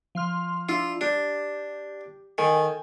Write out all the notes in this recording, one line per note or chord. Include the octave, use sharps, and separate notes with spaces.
F3 C6 F6
D4 E4 F4
D4 G4
D#3 A4 G5 G#5